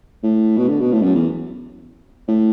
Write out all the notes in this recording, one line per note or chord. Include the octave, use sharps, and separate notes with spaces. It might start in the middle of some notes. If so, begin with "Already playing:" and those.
A2
B2
D3
B2
A2
F#2
E2
A2